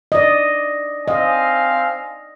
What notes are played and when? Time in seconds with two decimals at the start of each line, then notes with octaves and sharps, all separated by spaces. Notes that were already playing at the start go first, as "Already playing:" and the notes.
0.12 D5 D#5
1.08 C4 D#5 F5 G#5